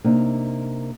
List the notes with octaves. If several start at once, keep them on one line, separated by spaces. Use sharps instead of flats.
C3 A#3 D4 D#4